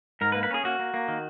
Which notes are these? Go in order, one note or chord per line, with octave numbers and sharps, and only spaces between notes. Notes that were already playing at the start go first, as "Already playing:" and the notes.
G#2 A#4
B4
A#3
B4
C#4 G#4
A#3 F#4
A#3
A#3
D#3